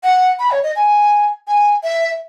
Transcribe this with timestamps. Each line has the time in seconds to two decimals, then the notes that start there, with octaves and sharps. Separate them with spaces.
0.03 F#5
0.39 B5
0.51 C#5
0.63 D#5
0.76 G#5
1.48 G#5
1.83 E5